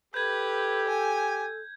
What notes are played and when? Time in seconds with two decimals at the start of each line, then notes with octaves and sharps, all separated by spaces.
0.14 G4 A4 B4 G6 G#6
0.89 G#5